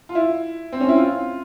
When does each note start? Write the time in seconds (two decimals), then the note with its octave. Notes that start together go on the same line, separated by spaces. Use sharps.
0.09 F4
0.15 E4
0.73 C4
0.81 C#4
0.89 E4
0.96 F4